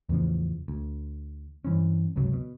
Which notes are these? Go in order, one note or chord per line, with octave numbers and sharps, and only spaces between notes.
E2 A2 C#3 F3
D2
G2 E3 C4 C#4
G1 C#2 C3 F#3
B2